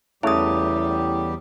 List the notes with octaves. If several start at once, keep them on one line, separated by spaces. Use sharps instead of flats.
E2 C#3 G3 A3 E4 G4 D#6